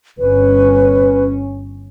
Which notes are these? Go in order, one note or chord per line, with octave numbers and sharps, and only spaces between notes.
G1 C#4 B4